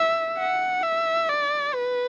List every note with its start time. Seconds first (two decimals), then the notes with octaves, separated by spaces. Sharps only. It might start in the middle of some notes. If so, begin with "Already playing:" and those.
Already playing: E5
0.38 F#5
0.83 E5
1.29 D5
1.74 B4